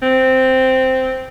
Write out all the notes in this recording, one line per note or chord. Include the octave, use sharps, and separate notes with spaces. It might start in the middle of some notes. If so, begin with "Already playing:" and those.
C4